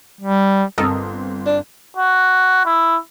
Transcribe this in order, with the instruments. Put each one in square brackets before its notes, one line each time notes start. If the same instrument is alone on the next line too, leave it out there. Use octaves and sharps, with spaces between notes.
[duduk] G3
[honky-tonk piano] G1 C4 [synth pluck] A4 A#4 D#5
[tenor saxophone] D4
[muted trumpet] F#4
E4